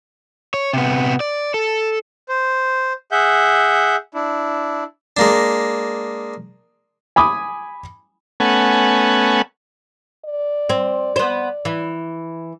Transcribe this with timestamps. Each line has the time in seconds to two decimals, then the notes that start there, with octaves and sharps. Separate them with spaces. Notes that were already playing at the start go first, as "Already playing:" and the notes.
0.54 C#5
0.73 C3 B3
1.20 D5
1.54 A4
2.29 C5
3.12 G#4 E5 F#5 G6
4.14 D4 E4
5.17 G#3 A#3 D4
7.16 G#5 B5 D6 D#6
8.40 A3 B3 C#4 F#5 G#5
10.25 D5
10.69 C4
11.16 B3 C5
11.65 E3